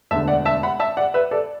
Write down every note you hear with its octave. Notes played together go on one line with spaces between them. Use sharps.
E1 D2 D3 E5 A5
D5 F#5
E5 A5
F#5 B5
E5 A5
D5 F#5
B4 E5
A4 D5